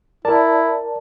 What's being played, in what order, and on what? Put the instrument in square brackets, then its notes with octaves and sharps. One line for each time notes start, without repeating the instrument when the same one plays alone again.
[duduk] E4 [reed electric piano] A#4 D5 A5